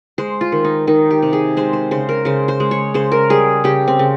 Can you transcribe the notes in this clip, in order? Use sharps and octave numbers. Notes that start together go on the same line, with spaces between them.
G#3 C5
F4
D#3
D#4
D#3 D#4
G4
C3
G#4
G#3 C5
C5
C#3 C5
A#4
C#3 C5
C5
G#3
C#5
C#3 C5
A#4
G3 G#4
C#3 G4
C4
C#3